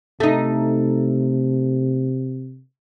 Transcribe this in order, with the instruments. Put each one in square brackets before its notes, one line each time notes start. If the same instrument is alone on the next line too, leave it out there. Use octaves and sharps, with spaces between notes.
[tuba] C3 [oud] A3 D#4